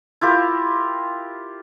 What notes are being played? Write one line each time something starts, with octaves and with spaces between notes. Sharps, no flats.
E4 F4 G4 A#4